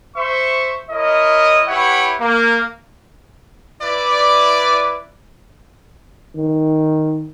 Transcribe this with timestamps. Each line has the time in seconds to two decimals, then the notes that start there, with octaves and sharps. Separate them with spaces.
0.16 C5 E5 C#6
0.91 E4 A#4 C#5 D#5
1.68 E4 G4 B4 C#5 F#5
2.20 A#3
3.82 E4 B4 D5
6.35 D#3